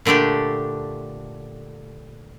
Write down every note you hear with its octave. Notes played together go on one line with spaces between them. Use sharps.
A#2 D3 A3 D4 G4